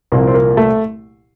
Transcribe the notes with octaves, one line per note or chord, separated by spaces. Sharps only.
C2 A#2 F3 A#3
C4
A#3
A3